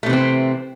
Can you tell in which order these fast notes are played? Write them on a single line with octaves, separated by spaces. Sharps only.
A3 C3 E3 C4